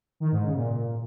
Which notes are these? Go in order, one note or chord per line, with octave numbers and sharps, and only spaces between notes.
D#3
G#2
C#3
A#2